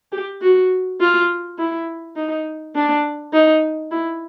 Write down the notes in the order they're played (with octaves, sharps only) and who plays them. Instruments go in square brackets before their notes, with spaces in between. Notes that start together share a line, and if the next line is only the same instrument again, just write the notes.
[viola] G4
F#4
F4
E4
D#4
D4
D#4
E4